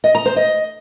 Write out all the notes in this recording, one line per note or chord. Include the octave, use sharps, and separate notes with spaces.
D#5
A#5
C5
D#5